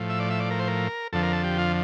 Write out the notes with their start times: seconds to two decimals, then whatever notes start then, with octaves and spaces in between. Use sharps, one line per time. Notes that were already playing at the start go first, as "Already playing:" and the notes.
Already playing: A2 F3
0.09 E5
0.20 D5
0.30 E5
0.40 D5
0.51 A#4
0.59 C5
0.68 A#4
1.13 F2 D3 F3 A4
1.23 A#4
1.33 A4
1.44 G4
1.58 F4